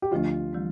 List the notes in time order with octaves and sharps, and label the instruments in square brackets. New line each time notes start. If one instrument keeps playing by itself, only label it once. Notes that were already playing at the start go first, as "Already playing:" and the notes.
[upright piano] G4
[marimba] D2 D3 F3 A3 D4 [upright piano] F4
[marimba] E3 G3 C4